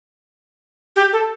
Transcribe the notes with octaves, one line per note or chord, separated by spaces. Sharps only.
G4
A4